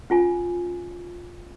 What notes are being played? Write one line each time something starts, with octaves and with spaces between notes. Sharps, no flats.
C#4 F4 G#5